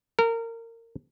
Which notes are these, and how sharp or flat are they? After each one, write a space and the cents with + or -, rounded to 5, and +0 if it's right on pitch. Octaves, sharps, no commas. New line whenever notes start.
A#4 -25